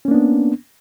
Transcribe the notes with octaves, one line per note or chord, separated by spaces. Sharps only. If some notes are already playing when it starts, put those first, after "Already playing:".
A#3 B3 C#4 D4